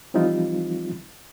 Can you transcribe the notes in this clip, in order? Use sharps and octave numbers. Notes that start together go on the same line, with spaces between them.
E3 F3 G3 C4 D#4 F4